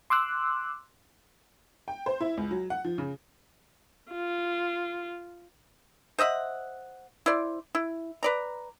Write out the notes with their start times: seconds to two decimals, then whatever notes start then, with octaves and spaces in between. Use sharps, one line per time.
0.10 C6 D6 E6 F#6
1.88 G5
2.06 C5
2.21 E4
2.37 C#2
2.51 F#3
2.70 F#5
2.84 F3
2.98 C#3
4.11 F4
6.19 C5 D#5 E5 F#5
7.26 E4 C5 D5
7.75 E4
8.23 B4 D5 A#5